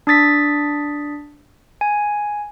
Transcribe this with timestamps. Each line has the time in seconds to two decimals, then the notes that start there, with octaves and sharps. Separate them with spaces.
0.07 D4 D#6 A6 B6
1.81 G#5